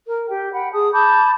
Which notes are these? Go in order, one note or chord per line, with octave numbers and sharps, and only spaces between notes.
A#4
G4 G5
F#5 G5 B5
G#4 A5 D#6
A5 B5 D6 G6